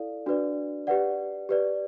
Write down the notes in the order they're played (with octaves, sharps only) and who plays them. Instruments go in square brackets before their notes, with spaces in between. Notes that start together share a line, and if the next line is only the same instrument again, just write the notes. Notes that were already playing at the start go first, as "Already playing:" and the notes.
Already playing: [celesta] E4 A4 D5 F5
D4 F#4 B4 D5
G4 B4 D5 F#5
G4 B4 D5